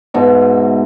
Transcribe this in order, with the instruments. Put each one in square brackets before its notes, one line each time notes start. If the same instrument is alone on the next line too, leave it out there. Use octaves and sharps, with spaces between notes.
[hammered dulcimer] G#2 B2 E5